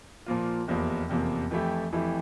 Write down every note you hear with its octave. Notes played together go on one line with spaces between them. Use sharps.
A#2 F3 A#3 F4
F1 E2 C3 F3 A#3
F1 E2 C3 F3 A#3
F2 E3 A3 E4 G4
F2 E3 A3 E4 G4